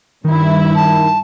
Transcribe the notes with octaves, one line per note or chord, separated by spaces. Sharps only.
G2 D#3 E4
A5